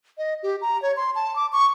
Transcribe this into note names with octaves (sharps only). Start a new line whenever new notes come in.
D#5
G4
A#5
C#5
C6
A5
D6
C#6